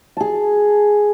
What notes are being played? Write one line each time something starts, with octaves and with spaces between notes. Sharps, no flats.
G#4 A5